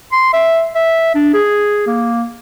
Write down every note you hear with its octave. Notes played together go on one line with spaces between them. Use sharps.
C6
E5
E5
D4
G#4
A#3